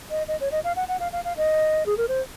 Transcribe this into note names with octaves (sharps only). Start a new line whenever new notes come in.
D#5
D#5
C#5
D#5
F5
F#5
F#5
F5
F5
F5
D#5
G#4
A#4
C5